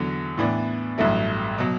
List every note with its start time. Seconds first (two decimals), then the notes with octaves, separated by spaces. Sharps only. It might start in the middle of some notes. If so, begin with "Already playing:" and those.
Already playing: E2 D3 F#3
0.38 A2 E3 B3 D4
0.98 A1 G2 F#3 A3 E4
1.58 B2 F#3